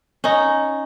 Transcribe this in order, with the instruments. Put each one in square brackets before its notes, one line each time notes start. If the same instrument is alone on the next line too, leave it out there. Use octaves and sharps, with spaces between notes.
[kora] C#4 D#4